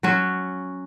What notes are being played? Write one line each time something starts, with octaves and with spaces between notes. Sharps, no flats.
F#3 C#4 F#4